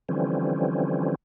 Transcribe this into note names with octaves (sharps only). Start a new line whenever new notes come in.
D3 E3 F3 G3 C4 C#4